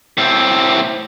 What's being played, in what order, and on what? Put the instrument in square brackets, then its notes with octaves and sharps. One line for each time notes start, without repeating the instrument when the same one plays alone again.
[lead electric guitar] A2 C4